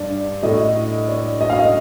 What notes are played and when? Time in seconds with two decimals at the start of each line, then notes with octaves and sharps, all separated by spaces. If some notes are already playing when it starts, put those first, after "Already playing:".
Already playing: G2 D5
0.42 A2 A3 D#5
1.09 D5
1.41 D#5
1.50 F5
1.59 D#5